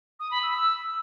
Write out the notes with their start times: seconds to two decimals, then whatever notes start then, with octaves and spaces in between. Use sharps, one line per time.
0.20 D#6
0.31 B5
0.43 E6
0.54 E6